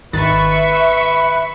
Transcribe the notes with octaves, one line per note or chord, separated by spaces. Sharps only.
G#1 D#3 B4 E5 B5 C#6 A6